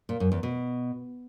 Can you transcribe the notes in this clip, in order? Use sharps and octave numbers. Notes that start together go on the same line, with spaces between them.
A#2
F#2
E2
B2